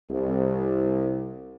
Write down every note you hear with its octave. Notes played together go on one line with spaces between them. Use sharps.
C2